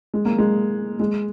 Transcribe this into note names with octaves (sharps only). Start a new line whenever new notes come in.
G#3
A#3
G#3
G#3